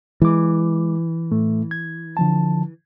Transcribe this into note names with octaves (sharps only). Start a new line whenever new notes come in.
E3 G#3 D6
A2 A3
G#6
D3 F3 A5